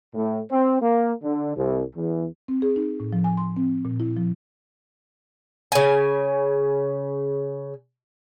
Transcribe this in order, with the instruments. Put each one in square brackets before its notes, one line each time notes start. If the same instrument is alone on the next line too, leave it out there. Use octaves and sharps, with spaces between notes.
[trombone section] A2
C4
A#3
D3
C2
E2
[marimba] C4
G#4
D#4
A2
F3
G#5
C6
C4
A#2
E4
F3
[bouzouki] C#3 G#5